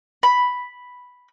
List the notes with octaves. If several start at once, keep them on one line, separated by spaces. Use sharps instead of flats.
B5